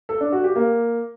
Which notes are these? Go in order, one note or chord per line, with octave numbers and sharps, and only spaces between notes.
A4
D4
F#4
G4
A#3